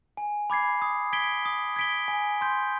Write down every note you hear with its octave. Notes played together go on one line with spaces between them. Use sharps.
G#5
B5 D6 G#6 C7
D#6
G#6 B6 D7 G7
D#6
G#6 B6 D7 G7
G#5
C6 G6